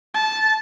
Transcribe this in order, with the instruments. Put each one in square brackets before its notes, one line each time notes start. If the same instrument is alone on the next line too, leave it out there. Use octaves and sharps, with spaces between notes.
[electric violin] A5